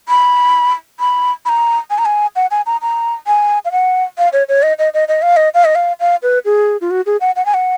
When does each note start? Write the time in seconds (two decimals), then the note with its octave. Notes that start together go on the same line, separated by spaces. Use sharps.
0.09 B5
1.00 B5
1.45 B5
1.49 A#5
1.90 G#5
1.98 A#5
2.05 G#5
2.36 F#5
2.51 G#5
2.66 A#5
2.82 A#5
3.27 G#5
3.65 F5
3.72 F#5
4.18 F5
4.33 C#5
4.49 C#5
4.63 D#5
4.79 D#5
4.94 D#5
5.08 D#5
5.22 F5
5.37 D#5
5.54 F5
5.65 D#5
5.75 F5
6.00 F5
6.23 B4
6.45 G#4
6.81 F4
6.91 F#4
7.06 G#4
7.21 F#5
7.36 F#5
7.46 G#5
7.54 F#5